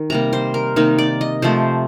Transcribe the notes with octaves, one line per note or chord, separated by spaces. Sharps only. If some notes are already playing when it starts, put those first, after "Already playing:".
Already playing: D#3
C3 G3 A#3 A#5
C5
A#4
C3 D#3 A#3 D#4
D5
D#5
C3 F3 A3 C5